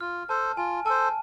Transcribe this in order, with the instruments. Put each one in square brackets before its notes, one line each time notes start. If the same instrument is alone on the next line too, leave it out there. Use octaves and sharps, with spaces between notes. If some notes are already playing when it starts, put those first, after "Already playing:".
[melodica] F4 [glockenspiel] F6
[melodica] A4 C5 [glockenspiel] A5
[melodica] F4 [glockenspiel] G#5
[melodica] A4 C5 [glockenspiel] A5